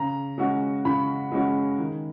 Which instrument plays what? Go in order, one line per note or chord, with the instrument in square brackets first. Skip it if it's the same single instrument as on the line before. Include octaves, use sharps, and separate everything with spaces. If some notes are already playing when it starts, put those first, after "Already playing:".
Already playing: [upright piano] C#3 [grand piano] A#5
[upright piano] G#3 C#4 F#4
[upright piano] C#3 [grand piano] B5
[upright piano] G#3 C#4 F#4
D#3